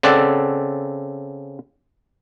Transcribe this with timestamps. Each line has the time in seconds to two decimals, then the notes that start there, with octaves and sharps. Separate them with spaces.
0.03 C#3 C4 A4 D5 F#5